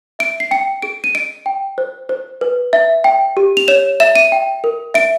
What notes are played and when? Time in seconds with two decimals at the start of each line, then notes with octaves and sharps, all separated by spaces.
0.19 E5 D7
0.40 C7
0.51 G5 C#7
0.82 G#4 D7
1.04 D#7
1.15 D#5 D7
1.46 G5
1.78 C5
2.09 C5
2.41 B4
2.73 E5
3.04 G5
3.37 G4
3.57 F7
3.68 C#5 E7
4.00 E5 E7
4.15 D#7
4.32 G5
4.64 A#4
4.94 E5 D7